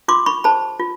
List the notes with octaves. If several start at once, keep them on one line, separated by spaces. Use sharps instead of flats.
F4 C6 D6
B5 C#6
G#4 C5 A5 B5
F4